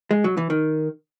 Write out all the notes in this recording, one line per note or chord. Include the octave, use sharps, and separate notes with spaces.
G#3
F#3
E3
D#3